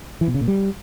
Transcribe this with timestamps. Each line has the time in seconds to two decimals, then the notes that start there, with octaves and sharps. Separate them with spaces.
0.21 E3
0.28 B2
0.34 C#3
0.41 A#2
0.48 G3